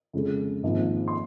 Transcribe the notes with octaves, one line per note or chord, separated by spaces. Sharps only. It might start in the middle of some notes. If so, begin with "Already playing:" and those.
F2 C#3 G#3
G#1 G#2 F3 A#3
C6